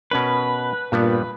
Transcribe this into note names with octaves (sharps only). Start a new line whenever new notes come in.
B2 C#4 A#4 B4
G2 A#2 G3 B3